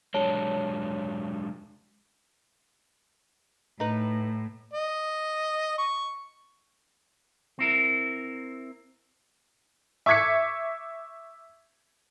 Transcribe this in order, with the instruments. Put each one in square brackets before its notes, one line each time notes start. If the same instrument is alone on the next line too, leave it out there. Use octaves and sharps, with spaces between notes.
[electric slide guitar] F#3 G#3 D4 [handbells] C#5 A5
[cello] A2 [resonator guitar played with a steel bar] D#4 B4
[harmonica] D#5
C#6
[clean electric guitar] C4 E4 A#4
[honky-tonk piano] E5 C#6 D6 G#6 B6 C#7